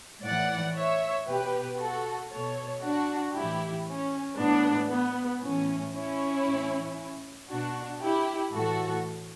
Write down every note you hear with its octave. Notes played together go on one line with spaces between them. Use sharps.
A2 E3 D5 F#5
C#5 E5
B2 G4 B4
F#4 A4
B2 A4 C#5
D4 F#4
A2 E3 E4 G4
C#4
A2 E3 B3 D4
B3
A2 E3 C#4
C#4 E4
A2 E3
B2 D4 F#4
E4 G4
A2 E3 F#4 A4